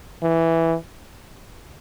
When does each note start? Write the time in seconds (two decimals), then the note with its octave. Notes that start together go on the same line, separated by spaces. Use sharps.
0.23 E3